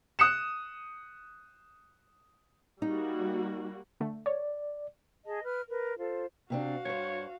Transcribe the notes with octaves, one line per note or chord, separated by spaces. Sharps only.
D#6 F#6 C#7 E7
G3 A#3 D#4 F#4
D3 A3
C#5 D5
G#4 D#5 A5
B4 F6
A#4 B4
F4 A4 C5
C3 C4 D4 F#4 F5
G2 C5 C#5